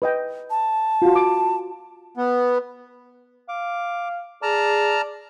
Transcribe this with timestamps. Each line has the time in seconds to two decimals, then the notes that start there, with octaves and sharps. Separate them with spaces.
0.02 B4 D#5 G5
0.50 A5
1.02 F4 F#4
1.16 D6
2.17 B3
3.49 F5 D6
4.42 G#4 D5 A5 A#5 F6